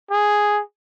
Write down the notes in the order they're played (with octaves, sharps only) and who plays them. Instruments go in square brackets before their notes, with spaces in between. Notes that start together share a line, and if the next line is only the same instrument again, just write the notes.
[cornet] G#4